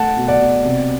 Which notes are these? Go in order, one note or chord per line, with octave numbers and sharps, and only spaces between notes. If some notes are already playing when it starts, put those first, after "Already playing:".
Already playing: A3 F#5 A5
B2
D5 F#5
B2
C3